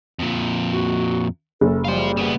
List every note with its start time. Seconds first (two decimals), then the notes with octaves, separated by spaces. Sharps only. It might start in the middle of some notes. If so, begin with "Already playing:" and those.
0.19 F2 A#2
0.71 F#4
1.61 F#1 A4
1.85 G3 F4 C5
2.17 C#3 B3